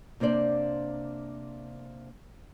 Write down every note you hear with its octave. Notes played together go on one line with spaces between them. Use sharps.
C3 A#3 D4 C5 D5